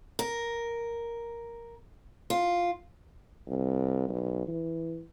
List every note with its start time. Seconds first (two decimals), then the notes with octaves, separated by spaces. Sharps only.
0.19 A#4
2.30 F4
3.47 C2
4.09 B1
4.48 E3